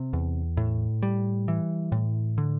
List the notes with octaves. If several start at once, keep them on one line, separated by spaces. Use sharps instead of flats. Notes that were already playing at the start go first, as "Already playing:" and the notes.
Already playing: C3
E2
A2
G3
E3
A2
D3